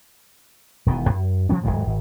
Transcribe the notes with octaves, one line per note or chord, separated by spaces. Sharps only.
E1 B2 D#3 B3
F#2
C#3 F3 B3 C#4
D#1 C#2 G#2 F#3
G#1